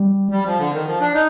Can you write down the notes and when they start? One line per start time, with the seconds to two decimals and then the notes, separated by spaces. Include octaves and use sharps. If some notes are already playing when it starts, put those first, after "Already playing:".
Already playing: G3
0.31 G3
0.45 F3
0.58 D3
0.73 D#3
0.86 F3
1.00 D4
1.14 D#4